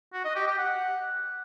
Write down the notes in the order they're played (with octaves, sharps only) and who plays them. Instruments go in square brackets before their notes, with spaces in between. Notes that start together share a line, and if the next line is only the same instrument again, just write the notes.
[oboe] F#4
D#5
G4
G4
F#5